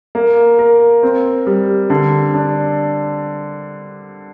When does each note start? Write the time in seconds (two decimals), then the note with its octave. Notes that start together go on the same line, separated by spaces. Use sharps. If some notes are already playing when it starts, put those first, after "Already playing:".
0.15 A#3
0.59 A#4
1.03 C4
1.47 G3
1.90 D3
2.34 D4